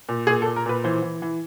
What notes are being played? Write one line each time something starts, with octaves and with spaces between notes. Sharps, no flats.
A#2
A#2 G#4
A4
A#2
A#4
A#2 B4
E3 C5
E3
E3